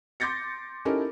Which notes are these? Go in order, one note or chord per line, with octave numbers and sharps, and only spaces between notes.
C6 D6 G6 A6 A#6 C#7
C#4 D#4 E4 G4 A4 A#4